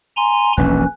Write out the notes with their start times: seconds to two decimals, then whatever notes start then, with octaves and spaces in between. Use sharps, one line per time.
0.17 G#5 A#5 C6
0.57 E1 A#1 D#2 C#4 B4